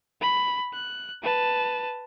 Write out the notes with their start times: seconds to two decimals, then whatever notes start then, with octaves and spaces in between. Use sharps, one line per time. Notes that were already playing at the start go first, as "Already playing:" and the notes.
0.21 B5
0.73 F#6
1.23 B4 A5